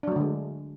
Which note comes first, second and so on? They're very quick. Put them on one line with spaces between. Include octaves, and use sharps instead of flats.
D4 F#3 A3 D3 G#3